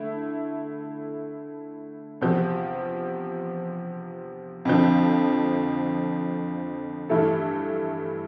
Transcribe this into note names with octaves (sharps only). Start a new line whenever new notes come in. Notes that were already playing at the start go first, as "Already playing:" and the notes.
Already playing: D3 A3 E4
E2 C3 F3
F2 D3 F3
G2 E3 A3 E4 A4